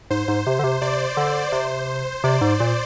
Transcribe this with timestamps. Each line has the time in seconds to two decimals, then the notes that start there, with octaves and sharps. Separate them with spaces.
0.10 G#2 C5
0.28 G#2
0.47 C3
0.59 D3
0.64 C3
0.82 C3 D5
1.17 D3
1.52 C3 C5
2.24 C3 D5
2.41 G#2
2.60 A#2